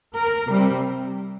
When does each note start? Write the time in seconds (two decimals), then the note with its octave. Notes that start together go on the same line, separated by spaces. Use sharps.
0.15 A#4
0.49 C3 G3 C4